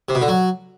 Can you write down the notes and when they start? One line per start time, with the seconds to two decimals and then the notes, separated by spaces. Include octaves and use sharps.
0.09 C3
0.15 B2
0.22 D3
0.28 F#3